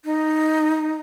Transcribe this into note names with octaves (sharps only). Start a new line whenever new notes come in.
D#4